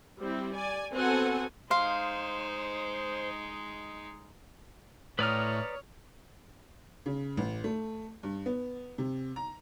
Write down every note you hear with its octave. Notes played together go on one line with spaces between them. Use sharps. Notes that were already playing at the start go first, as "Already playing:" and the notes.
G3 C4 E4
D5 G#5
B3 C4 F#4 A4 F#5 G#5
G#3 D#4 C5 F5 C6
A2 B4 C#5 D5 A#5 D#6 F6
C#3
A1
A3
G2
B3
C3
A#5